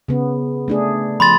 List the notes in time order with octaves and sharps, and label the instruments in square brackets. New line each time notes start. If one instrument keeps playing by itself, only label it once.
[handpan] C#3 B3
A3 D4 G#4
[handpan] F3 [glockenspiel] B5 C6 A6